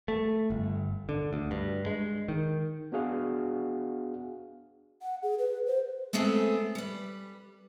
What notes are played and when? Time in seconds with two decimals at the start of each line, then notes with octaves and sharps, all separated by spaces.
0.08 A3
0.50 G1
1.09 D3
1.33 D2
1.51 G2
1.86 G#3
2.28 D#3
2.92 B3 D4 F#4 G#4 F5 F#5
5.02 F#5
5.23 G#4
5.39 B4
5.67 C5
6.13 G#3 A3 B3 C4 G#4 A4
6.75 G3 B4